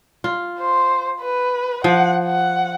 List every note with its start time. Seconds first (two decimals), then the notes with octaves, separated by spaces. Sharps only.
0.24 F4
0.58 C5
1.20 B4
1.84 F3 F#5
2.25 F#5